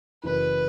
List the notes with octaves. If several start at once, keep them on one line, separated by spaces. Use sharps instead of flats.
F#1 F#2 E3 B4